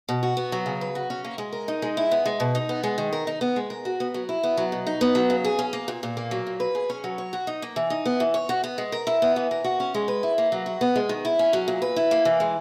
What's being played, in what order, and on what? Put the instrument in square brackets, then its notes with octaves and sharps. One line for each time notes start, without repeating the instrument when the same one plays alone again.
[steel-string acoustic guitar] B2
F#4
B3
F#3
C#3
B4
F#4
C#4
A#3
G#3
A#4
D#4
G#3
E4
B3
G#3
B2
D#4
B3
G#3
D#3
A#4
D#4
B3
G#3
A#4
F#4
B3
F#3
E4
B3
F#3
B2
D#4
B3
F#3
C#3
G#4
C#4
A#3
A#2
A#2
A#3
F#3
A#2
B4
G#4
C#4
F#3
C#5
F#4
D#4
A#3
E3
D#4
B3
E3
C#5
F#4
B3
G#3
A#4
E4
B3
E3
A#4
F#4
C#4
G#3
B4
E4
A#3
F#3
F#4
B3
G#3
D#3
E4
C#4
F#3
A#2
B4
E4
A#3
E3
G#3